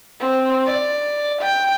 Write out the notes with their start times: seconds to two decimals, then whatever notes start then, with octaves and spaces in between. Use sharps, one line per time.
0.20 C4
0.66 D5
1.42 G5